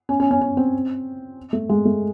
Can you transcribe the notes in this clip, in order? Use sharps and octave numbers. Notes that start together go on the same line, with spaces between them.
C#4
C#4
C#4
C#4
C4
A3
G#3
A3